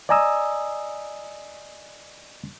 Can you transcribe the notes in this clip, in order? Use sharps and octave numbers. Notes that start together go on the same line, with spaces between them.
D5 D#5 G#5 A#5 D#6 E6